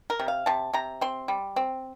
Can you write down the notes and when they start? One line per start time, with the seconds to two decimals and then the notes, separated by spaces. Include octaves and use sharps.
0.10 A#4
0.20 C3
0.28 F5
0.46 C3 A5
0.73 C3 A#5
1.01 C4 C6
1.28 G3
1.56 C4